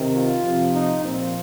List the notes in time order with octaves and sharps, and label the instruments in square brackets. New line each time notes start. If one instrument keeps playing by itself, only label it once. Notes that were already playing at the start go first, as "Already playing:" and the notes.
Already playing: [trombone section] C3 D#3
F4
C3 F3
D#4
A#2 F3 C4